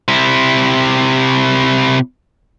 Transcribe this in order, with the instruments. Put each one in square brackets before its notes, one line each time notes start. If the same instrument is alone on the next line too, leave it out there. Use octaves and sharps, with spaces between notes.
[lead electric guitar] C3 E4